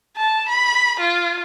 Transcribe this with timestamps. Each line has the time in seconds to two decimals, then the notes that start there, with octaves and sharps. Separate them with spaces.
0.17 A5
0.49 B5
1.00 F4